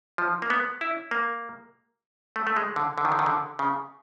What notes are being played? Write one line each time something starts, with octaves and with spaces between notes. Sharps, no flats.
F3
A#3
B3
E4
A#3
A3
A3
G#3
D3
D3
D#3
D3
D#3
D3
C#3